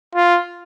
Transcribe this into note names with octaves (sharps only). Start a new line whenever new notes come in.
F4